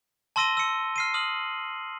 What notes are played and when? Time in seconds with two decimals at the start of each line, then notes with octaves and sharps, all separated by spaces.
0.36 A5 C6 E6 A#6 D#7 G7
0.57 E6 C#7
0.96 F6 C7 D#7
1.14 D#6 F6 F#7